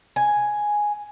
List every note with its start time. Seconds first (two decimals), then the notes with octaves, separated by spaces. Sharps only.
0.16 G#5